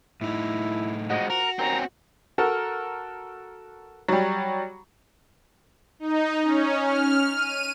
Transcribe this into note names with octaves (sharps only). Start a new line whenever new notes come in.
A2 D#4 E4
F3 G#3 F#4 D#5
F#4 A#4 F7
D#2 C4 C#4 A#5
F#4 A4 A#4
F#3 G3
D#4
C#4
F6
D#7